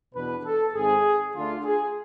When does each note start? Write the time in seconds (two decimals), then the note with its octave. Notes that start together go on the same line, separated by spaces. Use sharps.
0.13 E2 B2 B3 D4 B4
0.44 A4
0.74 G#1 G#2 G#3 C4 G#4
1.34 D2 D3 A3 D4 F4
1.64 G#4